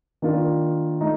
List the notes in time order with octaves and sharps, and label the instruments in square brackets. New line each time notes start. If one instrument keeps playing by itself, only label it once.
[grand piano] D#3 A#3 D4 F4 A#4
A3 D#4